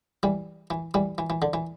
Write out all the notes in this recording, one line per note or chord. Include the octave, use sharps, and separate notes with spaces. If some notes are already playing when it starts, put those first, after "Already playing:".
E3 G3
E3
E3 G3
E3
E3
D3
E3